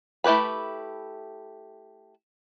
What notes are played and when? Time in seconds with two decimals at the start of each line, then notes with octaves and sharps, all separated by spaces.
0.24 A3 E4 G4 B4 B5